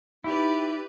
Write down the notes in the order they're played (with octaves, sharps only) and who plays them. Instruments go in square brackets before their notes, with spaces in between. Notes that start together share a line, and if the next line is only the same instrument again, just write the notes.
[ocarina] D#4 [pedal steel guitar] E4 [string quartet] G4 B4 D5